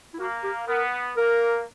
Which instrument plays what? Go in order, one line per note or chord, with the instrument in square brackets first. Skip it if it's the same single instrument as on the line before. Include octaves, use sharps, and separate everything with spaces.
[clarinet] E4
[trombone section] A#3 [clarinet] F#4
[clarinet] G4
[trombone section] B3 [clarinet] A#4
[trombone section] A#3 [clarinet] A#4